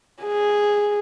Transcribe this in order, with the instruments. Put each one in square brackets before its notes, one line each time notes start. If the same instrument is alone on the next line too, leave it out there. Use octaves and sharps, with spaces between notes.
[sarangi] G#4